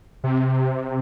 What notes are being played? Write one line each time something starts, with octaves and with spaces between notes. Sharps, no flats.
C3